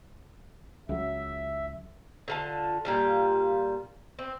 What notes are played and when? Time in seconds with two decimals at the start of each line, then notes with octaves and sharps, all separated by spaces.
0.89 C#2 F#3 E5
2.28 D3 F4 A5
2.85 A#2 G3 F4
4.19 C4